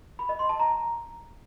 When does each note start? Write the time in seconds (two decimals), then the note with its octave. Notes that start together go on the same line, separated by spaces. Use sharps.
0.19 B5
0.29 D#5
0.39 C6
0.49 A5
0.59 A#5